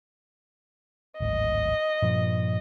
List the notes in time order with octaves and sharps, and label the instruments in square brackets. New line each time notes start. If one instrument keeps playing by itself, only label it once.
[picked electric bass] D1 G#1 [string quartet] D#5
[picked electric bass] G2 A#2 F3